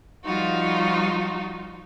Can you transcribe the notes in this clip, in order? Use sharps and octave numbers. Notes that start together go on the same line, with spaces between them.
F3 G3 D#4 F4 F#4